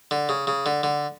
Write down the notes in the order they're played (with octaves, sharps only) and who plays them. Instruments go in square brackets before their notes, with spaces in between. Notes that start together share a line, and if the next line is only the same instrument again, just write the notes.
[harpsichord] D3
C#3
C#3
D3
D3